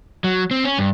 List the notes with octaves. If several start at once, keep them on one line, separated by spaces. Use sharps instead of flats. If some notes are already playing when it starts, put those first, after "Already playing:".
F#3
C4
C#4
G2